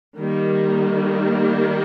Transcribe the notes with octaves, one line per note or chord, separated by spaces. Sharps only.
D#3 G3 A#3